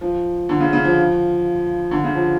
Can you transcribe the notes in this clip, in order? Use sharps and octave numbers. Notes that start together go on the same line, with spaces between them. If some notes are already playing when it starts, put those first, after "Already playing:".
F3
D3
C#3
C#3
F3
D3
C#3
F3